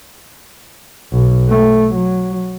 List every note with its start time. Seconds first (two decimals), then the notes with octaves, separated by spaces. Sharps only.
1.13 B1
1.49 A3
1.95 F#3